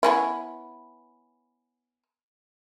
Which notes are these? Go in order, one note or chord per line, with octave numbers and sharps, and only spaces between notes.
B3 C#4 E4